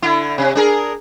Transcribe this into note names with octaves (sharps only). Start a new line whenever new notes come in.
D3 E4
C3
D4 G#4 A#4